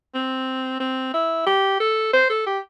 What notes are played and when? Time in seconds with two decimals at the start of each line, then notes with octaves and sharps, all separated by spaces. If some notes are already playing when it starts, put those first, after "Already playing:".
0.15 C4
0.80 C4
1.14 E4
1.46 G4
1.80 A4
2.13 C5
2.30 A4
2.47 G4